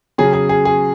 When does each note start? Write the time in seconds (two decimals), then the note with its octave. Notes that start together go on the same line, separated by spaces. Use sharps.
0.18 C#3 F#3 C#4 G#4
0.33 G#4
0.49 G#4
0.65 G#4